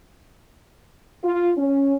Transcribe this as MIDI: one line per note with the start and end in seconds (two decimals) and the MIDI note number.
1.23 1.52 65
1.58 1.94 61